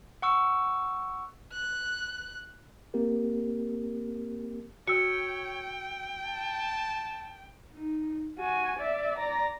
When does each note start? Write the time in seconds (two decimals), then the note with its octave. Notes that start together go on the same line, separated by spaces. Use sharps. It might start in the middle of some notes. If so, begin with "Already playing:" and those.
0.22 F#5 C#6 E6
1.52 F#6
2.94 A#3 C4 G4 A#4
4.88 F#4 C#5 G5 E6 C#7
6.22 A5
7.73 D#4
8.39 F#4 G#5
8.78 D5 E5
9.18 D5 A#5